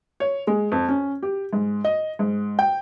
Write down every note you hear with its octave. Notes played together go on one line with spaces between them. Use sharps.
C#5
G#3
F2
C#4
G4
G#2
D#5
G#2
G5